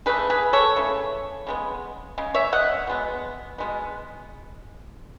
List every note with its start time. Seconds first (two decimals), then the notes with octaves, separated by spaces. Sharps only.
0.06 C#3 E3 A3 G#4 B4
0.30 G#4 B4
0.53 A4 C#5
0.76 C#3 E3 A3
1.47 C#3 G#3 B3
2.18 C#3 G#3
2.34 C#5 E5
2.53 D#5 F#5
2.87 B2 G#3 B3
3.58 B2 G#3 B3